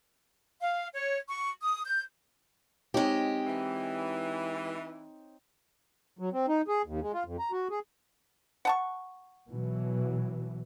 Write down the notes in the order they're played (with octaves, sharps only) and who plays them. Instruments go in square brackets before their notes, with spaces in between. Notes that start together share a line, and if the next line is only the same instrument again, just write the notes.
[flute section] F5
C#5
C#6
D#6
G6
[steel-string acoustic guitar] G#3 G4 [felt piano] C4 D#4 C#5
[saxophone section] E3
[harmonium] F#3
C4
D#4
G#4
D#2
G#3
F4
F2
A#5
F#4
G#4
[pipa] F#5 A5 C#6
[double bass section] B2 E3 F#3